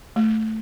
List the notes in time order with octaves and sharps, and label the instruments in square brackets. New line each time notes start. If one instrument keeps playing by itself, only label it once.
[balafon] A3